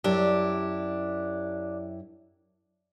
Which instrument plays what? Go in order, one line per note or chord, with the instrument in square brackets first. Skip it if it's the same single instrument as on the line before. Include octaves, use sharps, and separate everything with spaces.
[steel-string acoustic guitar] F#2 E4 G4 [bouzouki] D4